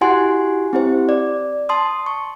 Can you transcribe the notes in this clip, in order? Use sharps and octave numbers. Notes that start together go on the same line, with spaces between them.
E4 F#4 G4 F#5 G#5 C6
C4 E4 G4 C5
D5
A5 C6 D#6
C#6